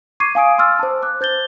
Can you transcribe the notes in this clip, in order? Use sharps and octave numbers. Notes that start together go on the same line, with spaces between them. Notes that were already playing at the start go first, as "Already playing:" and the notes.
C#6 D6 G#6 C7 D#7
F5 G#5 D#6 D7
C6 D6 E6 F6 A6
C5 A5
D6 F#6
C5 G6 A6 G7